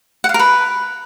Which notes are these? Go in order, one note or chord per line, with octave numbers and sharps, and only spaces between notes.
F#5
F5
A#4
B4